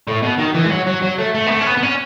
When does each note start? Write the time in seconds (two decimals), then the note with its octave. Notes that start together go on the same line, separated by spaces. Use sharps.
0.08 A2
0.23 B2
0.38 D#3
0.55 E3
0.65 G#3
0.71 F#3
0.87 F#3
1.02 F#3
1.18 A3
1.35 A3
1.46 B3
1.51 A3
1.61 C#4
1.67 B3
1.77 B3
1.83 C#4